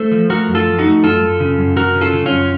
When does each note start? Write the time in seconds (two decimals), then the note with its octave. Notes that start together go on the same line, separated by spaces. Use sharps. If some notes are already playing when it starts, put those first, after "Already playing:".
Already playing: A3 A4 C5
0.12 F3
0.30 A3 F#4 A#4
0.48 F#2
0.55 F4 A4
0.67 F3
0.79 D#4 F#4
0.85 A3
1.03 F#2 F4 A4
1.22 F#2
1.40 C#3
1.59 F#2
1.77 F#2 F#4 A#4
1.95 C#3
2.01 F4 A4
2.13 C#3
2.26 C#4 F4
2.31 F#2